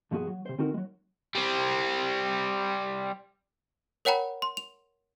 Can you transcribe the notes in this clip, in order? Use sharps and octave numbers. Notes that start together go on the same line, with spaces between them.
B1 G2 F3 B3 F#4 G#4
F#3
C3 C5
D3 C4 D#4 F#4 A#4
F#3 G#3
G3 C4
A#4 C#5 F#5 G5 A#5 B5
C6
F7